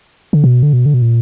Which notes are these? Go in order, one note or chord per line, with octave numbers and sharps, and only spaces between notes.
D3
B2
D3
B2
D3
B2
A#2